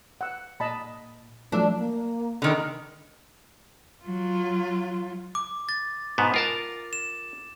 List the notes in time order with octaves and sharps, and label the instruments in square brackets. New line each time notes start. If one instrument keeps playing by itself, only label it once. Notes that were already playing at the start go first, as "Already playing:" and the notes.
[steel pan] F#5 E6
[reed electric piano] A#2 [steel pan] D#5 A5 B5
[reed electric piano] F3 F#3 A3 [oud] D4 [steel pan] A4 E5 E6
[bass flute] A#3
[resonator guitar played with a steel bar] D3 D#3 A#4
[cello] F#3 F4
[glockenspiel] D6
A6
[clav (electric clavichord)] G#2 B2 B3
F4 A#4 A5
[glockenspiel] E7